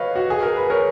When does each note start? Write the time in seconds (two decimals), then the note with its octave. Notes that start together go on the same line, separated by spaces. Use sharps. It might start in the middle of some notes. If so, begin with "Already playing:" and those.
Already playing: B4 C#5 D#5 F5
0.16 F#4
0.30 G#4
0.43 A#4
0.57 B4
0.70 A#4 C#5